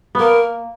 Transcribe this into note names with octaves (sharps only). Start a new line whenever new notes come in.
A#3 B3 A#4